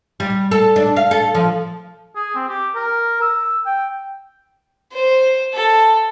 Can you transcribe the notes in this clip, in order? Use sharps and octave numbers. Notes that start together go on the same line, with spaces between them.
G3
A4
D4
F5
A4
F3
G#4
C4
G4
A#4
E6
G5
C5
A4